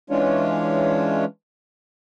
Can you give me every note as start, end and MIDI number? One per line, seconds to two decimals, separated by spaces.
0.10 1.25 52
0.10 1.25 56
0.10 1.25 61
0.10 1.25 62
0.10 1.25 65
0.10 1.25 73